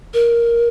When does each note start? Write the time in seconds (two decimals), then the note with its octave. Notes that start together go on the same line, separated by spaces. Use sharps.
0.14 A#4